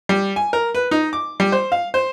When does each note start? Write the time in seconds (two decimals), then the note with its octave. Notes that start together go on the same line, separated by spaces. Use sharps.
0.09 G3
0.36 G#5
0.53 A#4
0.75 B4
0.91 D#4
1.13 D6
1.40 G3
1.52 C5
1.72 F5
1.94 C5